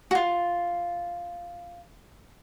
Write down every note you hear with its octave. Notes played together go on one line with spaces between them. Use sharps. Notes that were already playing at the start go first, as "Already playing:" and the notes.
F4 F#4